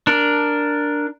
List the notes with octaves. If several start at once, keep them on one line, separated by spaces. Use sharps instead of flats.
D4 A#4